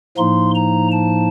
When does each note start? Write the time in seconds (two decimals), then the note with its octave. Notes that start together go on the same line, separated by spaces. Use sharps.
0.18 A2 F3 A#3 D#4 C6
0.55 A#5
0.92 A5